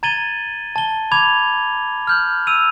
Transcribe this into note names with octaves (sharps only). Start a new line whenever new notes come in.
A#5 G#6 A6 D#7 F#7 G7
A5 G7
B5 D6 G#6 F7
F6 G6 F#7
E6 D#7 F7